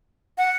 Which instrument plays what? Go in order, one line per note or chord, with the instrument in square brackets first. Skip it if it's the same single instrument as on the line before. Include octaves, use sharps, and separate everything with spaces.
[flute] F#5